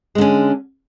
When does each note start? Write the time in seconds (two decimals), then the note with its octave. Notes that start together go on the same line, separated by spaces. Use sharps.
0.15 G#3
0.18 D3
0.21 C#4